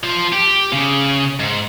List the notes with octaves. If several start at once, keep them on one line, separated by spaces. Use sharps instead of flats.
F3
G4
C#3
G#2